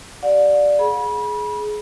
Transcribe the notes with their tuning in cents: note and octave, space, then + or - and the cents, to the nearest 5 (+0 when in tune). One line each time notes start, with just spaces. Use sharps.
G4 -20 D5 +0 F#5 -45
G#4 +20 B5 -30